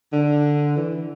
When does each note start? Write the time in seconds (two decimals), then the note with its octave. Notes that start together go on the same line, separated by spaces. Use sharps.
0.13 D3
0.77 E3